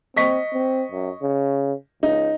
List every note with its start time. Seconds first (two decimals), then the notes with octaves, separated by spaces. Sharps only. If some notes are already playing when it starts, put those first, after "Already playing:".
0.16 C4 D#5 C#6 B6
0.53 C4
0.92 F#2
1.22 C#3
2.03 C#2 D#4